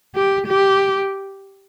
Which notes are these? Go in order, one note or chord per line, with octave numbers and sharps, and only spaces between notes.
G4
G4